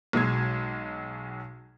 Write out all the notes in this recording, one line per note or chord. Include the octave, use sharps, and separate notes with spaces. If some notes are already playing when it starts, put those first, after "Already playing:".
B1 F#3 G#3 G#6